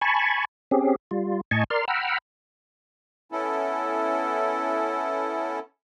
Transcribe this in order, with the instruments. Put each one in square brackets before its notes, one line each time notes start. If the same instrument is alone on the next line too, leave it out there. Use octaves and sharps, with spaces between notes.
[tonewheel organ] G#5 A5 B5 C#6
C4 C#4 G4 G#4
G3 F4
A2 D#5 G#5 A5 C#6
A#4 D5 C6 F6
F#5 G5 A#5 B5 E6 F6
[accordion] B3 C#4 E4 A4